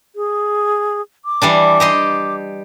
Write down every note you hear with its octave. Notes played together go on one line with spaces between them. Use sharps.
G#4
D6
E3 G3 D4
G4 D#5 C6